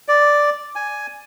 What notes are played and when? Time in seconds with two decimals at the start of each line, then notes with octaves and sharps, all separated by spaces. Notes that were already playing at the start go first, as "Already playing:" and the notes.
0.08 D5
0.76 G#5